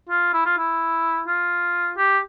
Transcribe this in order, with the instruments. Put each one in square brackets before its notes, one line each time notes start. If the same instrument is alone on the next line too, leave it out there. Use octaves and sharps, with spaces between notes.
[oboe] F4
E4
F4
E4
F4
G4